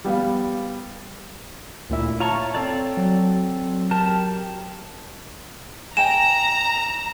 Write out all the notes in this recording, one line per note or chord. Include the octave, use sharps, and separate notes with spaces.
G3 B3 F5
D2 A#2 E4
F4 C#5 A5 A#5 C#6
C4 A4 D5
F#3
G4 A#4 A5
D#5 G5 G#5 A#5 E7